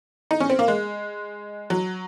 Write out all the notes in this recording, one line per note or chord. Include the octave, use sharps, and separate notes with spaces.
D#4
C#4
C4
A#3
G#3
F#3